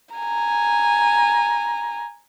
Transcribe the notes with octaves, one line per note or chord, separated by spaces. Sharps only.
G#5 A#5